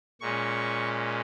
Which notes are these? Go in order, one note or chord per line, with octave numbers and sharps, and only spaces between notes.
A#2 G#3 C#4 C#6